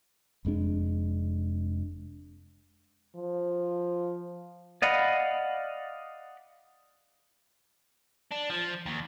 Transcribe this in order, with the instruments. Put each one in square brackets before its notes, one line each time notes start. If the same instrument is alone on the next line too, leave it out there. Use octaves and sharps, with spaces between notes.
[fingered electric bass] F1 F2 G#3 D4
[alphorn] F3
[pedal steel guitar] D5 D#5 F5 F#5 B5
[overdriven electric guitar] D4
F3
D#2